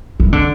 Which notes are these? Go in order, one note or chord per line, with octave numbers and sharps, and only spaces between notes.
E3
D3